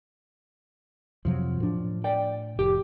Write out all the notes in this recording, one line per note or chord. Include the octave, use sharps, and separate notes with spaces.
F2 C3 F3 F#3
A2 D4
D5 G5
F1 G4